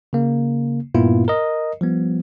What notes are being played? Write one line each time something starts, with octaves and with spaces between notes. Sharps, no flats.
C#3 A#3
G2 A#2 A#3 B3 E4 F4
A#4 D#5
F3 G3 B3